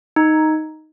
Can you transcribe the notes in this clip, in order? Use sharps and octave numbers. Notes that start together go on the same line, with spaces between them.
D#4